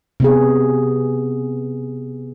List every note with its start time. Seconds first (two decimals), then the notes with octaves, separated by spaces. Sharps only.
0.20 C3 B3 G#4